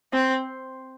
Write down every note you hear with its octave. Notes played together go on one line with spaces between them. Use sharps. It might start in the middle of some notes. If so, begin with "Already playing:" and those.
C4